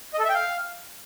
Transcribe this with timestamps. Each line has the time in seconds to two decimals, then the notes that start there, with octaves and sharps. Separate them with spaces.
0.14 D#5
0.19 A4
0.24 E5
0.29 G5
0.34 F5